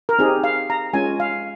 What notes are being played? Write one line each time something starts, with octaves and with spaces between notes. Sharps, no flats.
A#4
C4 D#4 G4 G#4
F5
A#5
G#3 C#4 F4 G#5
F5